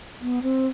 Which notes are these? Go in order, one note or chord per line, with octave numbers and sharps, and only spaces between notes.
B3
C4